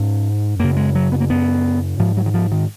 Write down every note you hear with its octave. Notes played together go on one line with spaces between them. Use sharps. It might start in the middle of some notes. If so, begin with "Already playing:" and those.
Already playing: G#2 C#4
F#2 C#3 A#3
G#3
F#3
B3
A#3
F#2 C#3 B3
G#2 F3
F#3
D#3
F3
D#3